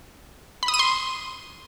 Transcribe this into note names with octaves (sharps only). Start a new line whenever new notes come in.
B5
D#6
D#7
C6